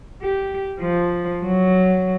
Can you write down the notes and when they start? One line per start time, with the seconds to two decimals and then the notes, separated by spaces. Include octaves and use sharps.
0.22 G4
0.81 F3
1.45 F#3